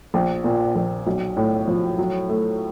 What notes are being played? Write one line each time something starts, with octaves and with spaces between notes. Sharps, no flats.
A#1
A#2
A#1
B1
A2
F3
F#3
A3